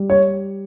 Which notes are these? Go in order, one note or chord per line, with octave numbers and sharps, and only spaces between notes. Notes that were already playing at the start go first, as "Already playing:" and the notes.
Already playing: G3
C#5